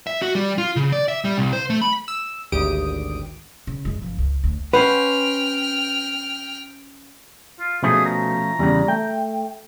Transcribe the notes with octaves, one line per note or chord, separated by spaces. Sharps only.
E5
F#4
G3
F4
C#3
D5
E5
G3
C2
C5
A3
B5
E6
G#1 D2 G4 D#6 D7
C#3
F#2 G#3
G1 F3
C#2
D2
C#4 B4 C5 F#5 G5 F6
F4
B2 F3 A3 C#4 G#4
A#5
E2 C#3 G3
A3 G5